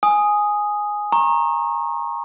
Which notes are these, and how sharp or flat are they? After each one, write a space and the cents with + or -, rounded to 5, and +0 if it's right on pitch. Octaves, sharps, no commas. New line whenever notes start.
G#5 +0 D#6 +0
A#5 +0 C#6 -35